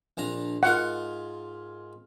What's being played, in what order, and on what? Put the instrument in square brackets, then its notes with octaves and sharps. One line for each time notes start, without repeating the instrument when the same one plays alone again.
[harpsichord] A#1 D4 A#5
[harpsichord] G#2 F4 A#4 [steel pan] F#5